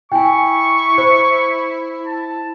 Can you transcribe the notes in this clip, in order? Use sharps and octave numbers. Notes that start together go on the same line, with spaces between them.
E4 G5 G#5 C#6
C5
A5